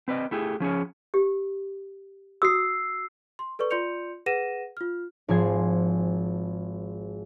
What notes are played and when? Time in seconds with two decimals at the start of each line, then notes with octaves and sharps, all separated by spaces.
0.08 C4 B4 D5 D#5
0.31 A3 E4 G4 G#4
0.60 F3 C#4 G#4 C#5
1.14 G4
2.42 F#4 D#6 E6 C7
3.39 C6
3.59 A4 B4 D5 C#6
3.70 F4 D5 C6 G6 C#7 F7
4.26 G#4 B4 F#5 A#6 D#7 E7
4.77 F4 F6
5.28 G#1 F3 G#4 C5 G#6